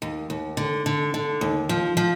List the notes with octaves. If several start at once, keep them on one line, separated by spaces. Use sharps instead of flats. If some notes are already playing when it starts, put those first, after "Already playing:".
D#2
D#2
D3
D3
D3
D#2
F3
F3